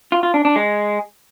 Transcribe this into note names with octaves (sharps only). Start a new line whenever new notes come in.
F4
F4
D4
D4
G#3